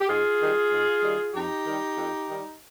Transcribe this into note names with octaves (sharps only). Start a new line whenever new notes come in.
G4
G#2 F4 G#4
D#3 G3
G#2
D#3 G3
F2 D#4 G4
D#3 G3
F2
D#3 G3